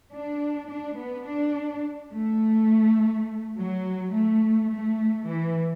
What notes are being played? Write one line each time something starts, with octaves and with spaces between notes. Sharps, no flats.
D4
D4
B3
D4
A3
F#3
A3
A3
E3